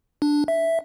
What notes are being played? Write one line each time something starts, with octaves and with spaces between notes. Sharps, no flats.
D4
E5